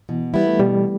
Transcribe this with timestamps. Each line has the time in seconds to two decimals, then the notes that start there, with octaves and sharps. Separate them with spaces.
0.09 B2 E3
0.34 G3 B3 E4
0.47 A3
0.59 B2 G3